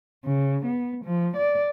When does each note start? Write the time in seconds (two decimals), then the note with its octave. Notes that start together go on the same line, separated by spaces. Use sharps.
0.24 C#3
0.66 B3
1.05 F3
1.36 D5